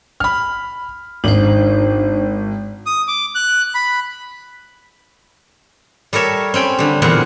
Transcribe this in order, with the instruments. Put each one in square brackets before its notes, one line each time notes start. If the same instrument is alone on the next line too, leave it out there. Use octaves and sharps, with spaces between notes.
[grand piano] B5 F6
[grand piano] G#1 [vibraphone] D4 D#4 C5
[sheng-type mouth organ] D#6
D6
F#6
B5
[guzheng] G3 A4 A#4 C#5 E5
C4 C#4 G5 B5
D3 G3
E2 A#2 D3 C4 F#5